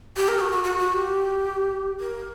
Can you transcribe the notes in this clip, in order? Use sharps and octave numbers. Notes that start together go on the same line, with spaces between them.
G4
A#4
F#4
F#4
F#4
F#4
G4
A#4